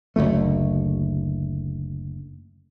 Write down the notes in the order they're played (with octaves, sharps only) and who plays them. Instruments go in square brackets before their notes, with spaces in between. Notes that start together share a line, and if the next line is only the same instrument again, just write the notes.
[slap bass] F#1 D2 A3